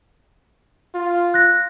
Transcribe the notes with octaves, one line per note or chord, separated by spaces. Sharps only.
F4
F#6 A#6